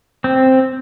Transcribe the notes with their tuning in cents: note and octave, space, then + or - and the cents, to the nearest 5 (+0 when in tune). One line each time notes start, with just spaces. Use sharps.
C4 +0